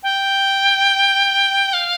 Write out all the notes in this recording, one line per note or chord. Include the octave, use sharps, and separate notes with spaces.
G5
F5